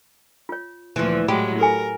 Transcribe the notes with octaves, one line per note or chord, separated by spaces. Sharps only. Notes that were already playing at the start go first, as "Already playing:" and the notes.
F4 C#5
D2 A#2 E3 F3
A2 F#3 G#3 G4 B5
F#4 A4 A#4 G#5